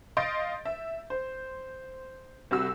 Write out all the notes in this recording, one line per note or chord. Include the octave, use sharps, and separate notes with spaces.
D#5 F5 C6 G6 A6 D7
E5
C5
C2 C3 F#4 E6